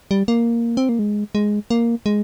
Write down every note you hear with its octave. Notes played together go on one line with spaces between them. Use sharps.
G3
A#3
C4
A#3
G#3
G#3
A#3
G#3